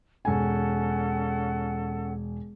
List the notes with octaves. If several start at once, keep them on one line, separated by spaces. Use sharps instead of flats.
E1 C#4 A4 F#5 G#5